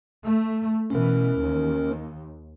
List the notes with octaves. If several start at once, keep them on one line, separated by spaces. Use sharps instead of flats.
A3
B2 E3 C#4 A#4
D#2